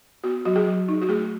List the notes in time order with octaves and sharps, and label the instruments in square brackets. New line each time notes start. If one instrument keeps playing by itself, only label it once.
[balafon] B3 F#4
F#3 F#4
G#4
F#3
D#4
F#4
A3 G#4